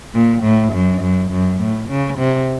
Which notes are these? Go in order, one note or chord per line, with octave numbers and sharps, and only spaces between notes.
A#2
A2
F#2
F#2
F#2
A2
C#3
C3